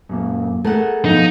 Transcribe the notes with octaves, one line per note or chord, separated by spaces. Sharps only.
F#2 A#2
A3 G#4 A#4 E5 F#5
B2 F3 D#4